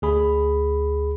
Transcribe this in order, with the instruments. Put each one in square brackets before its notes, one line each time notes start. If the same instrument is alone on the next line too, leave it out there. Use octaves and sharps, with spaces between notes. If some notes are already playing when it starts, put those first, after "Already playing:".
[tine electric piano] D2 G#4 B5